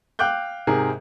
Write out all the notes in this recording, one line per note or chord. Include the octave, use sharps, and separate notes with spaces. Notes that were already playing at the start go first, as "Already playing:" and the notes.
F5 G5 D6 F#6 G6
G#2 C3 G#4 A#4